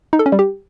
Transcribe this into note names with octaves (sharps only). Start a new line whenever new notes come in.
D#4
A4
C#4
G3
G4